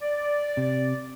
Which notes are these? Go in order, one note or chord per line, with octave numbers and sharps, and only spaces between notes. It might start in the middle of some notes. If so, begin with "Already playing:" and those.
D5
C3